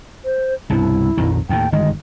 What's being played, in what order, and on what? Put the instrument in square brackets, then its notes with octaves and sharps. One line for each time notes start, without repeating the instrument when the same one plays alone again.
[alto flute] C5
[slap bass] C2 G2 B2 [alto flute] E4
[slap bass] A#1 F2 D#3
[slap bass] D#2 A2 [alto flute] G5
[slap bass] G1 D#3 G#3 [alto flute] D#5